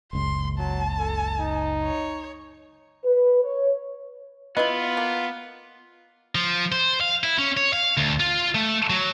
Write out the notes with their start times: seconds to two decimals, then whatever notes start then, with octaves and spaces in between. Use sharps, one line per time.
0.13 F#1 C#2 C6
0.58 F#3 A5
0.99 A4
1.40 D#4
1.83 C#5
3.04 B4
3.43 C#5
4.57 B3 E4 F4 B4 D#5
4.97 A#3
6.35 F3
6.72 C5
7.01 F5
7.24 E4
7.38 C#4
7.57 C#5
7.73 F5
7.97 D2
8.20 F4
8.55 A3
8.90 F#3